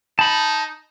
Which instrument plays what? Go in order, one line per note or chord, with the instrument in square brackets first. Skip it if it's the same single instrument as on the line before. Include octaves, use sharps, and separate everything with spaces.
[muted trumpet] D#4 [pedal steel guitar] A5 B5